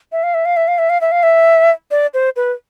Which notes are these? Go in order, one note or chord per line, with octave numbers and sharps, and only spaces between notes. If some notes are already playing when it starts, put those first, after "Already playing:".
E5
F5
E5
F5
E5
F5
E5
F5
E5
F5
E5
D5
C5
B4